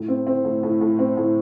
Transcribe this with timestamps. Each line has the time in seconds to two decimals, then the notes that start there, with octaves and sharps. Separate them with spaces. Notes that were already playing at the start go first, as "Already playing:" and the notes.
Already playing: A2
0.08 C4
0.27 C4
0.44 A2
0.63 A2
0.81 A2
0.99 C4
1.17 A2